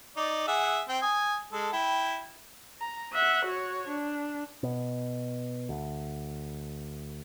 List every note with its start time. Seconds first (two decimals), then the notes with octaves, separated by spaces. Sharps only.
0.17 D#4 D5
0.48 G#4 E5 F#5
0.89 C4 G5
1.02 G#5 D#6
1.52 G#3 A4
1.73 E4 G5
2.80 A#5
3.13 E5 F#5
3.45 F#4 C#5
3.88 D4
4.63 B2
5.69 D2